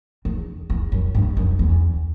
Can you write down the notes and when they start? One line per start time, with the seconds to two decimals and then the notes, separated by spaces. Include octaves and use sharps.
0.25 E2
0.70 E2
0.92 F#2
1.15 G2
1.37 F#2
1.59 E2